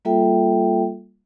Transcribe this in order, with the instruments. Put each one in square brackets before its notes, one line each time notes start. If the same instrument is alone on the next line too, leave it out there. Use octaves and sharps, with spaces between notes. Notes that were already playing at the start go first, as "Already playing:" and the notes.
[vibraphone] G3 A#3 F4 A4 E5 G5